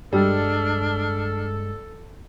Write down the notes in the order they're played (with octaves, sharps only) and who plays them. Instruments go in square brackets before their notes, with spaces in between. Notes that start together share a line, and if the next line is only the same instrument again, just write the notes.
[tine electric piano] G2 G#3 [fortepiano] G3 [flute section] D4 F6 [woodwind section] A4